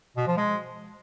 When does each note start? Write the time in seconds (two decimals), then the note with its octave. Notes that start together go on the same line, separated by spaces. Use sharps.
0.17 B2
0.27 F3
0.37 G#3